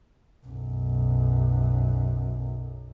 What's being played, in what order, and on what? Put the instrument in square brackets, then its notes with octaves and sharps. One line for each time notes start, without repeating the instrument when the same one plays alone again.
[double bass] B1 F#2